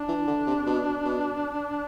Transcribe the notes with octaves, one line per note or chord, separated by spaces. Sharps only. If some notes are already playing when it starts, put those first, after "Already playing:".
Already playing: D4
E3
D3
C3
B2
B2